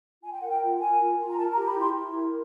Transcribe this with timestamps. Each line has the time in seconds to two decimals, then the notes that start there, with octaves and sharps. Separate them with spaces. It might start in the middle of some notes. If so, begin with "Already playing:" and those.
0.23 F4 G#5
0.32 G5
0.40 A#4 F#5
0.49 G5
0.61 F4
0.80 A#4 G#5
0.99 F4
1.18 F4
1.28 A#5
1.37 A#4 A5
1.53 A#5
1.56 G4
1.67 B5
1.76 E4 C6
1.95 E4
2.14 A#4